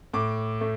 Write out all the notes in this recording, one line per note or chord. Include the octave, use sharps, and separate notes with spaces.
A2 D6
A3